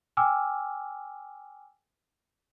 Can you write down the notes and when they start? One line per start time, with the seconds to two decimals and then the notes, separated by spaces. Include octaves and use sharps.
0.17 G5 G#5 D6 E6 F6